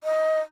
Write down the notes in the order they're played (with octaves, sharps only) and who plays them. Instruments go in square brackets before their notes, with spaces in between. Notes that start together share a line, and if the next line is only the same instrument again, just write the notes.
[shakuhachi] D#5